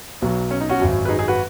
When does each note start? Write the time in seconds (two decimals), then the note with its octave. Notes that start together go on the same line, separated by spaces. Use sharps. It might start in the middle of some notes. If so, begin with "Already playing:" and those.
0.22 B1 B2 F#3
0.51 C#4
0.61 D#4
0.69 C#4 F#4
0.80 G#1 F#2 F#3
1.05 B4
1.09 D#4 G#4
1.19 D#4 G#4
1.28 F#4 B4